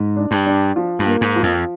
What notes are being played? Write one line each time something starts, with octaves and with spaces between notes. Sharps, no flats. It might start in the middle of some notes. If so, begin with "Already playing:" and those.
Already playing: G#2
D4
G2
D4
F3
G2
A#3
G#2
F3
F2